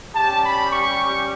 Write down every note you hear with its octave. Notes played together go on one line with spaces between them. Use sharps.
G3 C#4 G4 A5
B5
C#6